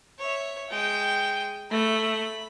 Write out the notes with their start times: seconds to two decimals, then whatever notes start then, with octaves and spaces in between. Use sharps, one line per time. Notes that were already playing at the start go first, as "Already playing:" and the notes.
0.19 C#5 E5
0.69 G#3 G5
1.71 A3 B5